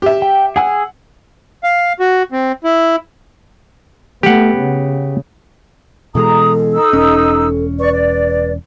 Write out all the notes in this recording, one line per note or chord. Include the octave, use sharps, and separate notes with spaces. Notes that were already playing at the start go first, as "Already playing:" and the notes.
G4 E5
G5
G#4 F#5 G#5 E6
F5
F#4
C4
E4
A3 B3 G4 F#5
C#3
B2 E3 G#3 A4 A#5 D#6
D#4 E6
E1 C#4
B4 D5 C#6
D5